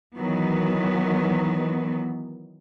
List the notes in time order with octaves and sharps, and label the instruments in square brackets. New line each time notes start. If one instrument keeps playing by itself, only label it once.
[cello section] D#3 E3 F#3 B3